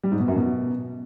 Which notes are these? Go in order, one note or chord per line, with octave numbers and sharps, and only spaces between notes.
G3
G#2
B2
F#2
B2